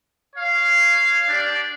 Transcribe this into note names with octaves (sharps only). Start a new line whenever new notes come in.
C#5 F5
D4 G4 D5